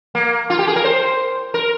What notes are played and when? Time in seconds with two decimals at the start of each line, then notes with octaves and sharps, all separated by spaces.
0.15 A#3
0.50 F4
0.59 G4
0.67 G#4
0.76 A#4
0.84 C5
1.54 A#4